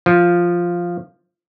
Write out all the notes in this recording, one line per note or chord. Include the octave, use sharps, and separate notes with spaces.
F3